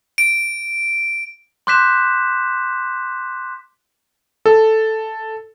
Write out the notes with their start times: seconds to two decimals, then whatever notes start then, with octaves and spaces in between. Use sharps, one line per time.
0.18 D7
1.67 C6 D6 F#6 G6 B6 E7
4.46 A4